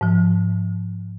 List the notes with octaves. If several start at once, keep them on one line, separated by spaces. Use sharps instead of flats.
G#2 F3